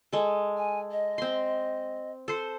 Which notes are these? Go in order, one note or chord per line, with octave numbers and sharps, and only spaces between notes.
G#3 A4
G#5
D#5
C4 C6
A4 C5